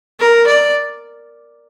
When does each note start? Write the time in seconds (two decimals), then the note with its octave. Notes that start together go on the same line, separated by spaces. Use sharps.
0.20 A#4
0.47 D5